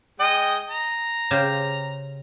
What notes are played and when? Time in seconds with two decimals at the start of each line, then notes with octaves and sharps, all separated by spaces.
0.20 G#3 D#5 G5
0.69 A#5
1.31 C#3 G4 C5